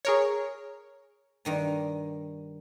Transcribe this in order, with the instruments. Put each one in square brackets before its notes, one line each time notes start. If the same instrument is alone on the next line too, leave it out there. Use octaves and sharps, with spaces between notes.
[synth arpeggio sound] G#4 A#4 C#5
[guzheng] G2 D#3 A#5